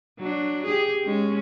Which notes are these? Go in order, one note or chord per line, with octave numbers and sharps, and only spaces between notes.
F#3 D4
G4 G#4
G#3 C#4